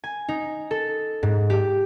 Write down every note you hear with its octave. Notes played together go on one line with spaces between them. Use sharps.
G#5
D#4
A4
G#2
G4